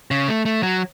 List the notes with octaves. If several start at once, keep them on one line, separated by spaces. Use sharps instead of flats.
C#3
A3
A3
F#3